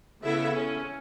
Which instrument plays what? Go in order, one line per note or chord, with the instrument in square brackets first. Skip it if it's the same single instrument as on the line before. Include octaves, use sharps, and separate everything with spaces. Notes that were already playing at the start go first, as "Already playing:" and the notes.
[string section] C#3 [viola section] B3 E4 A4 E5
[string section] C#4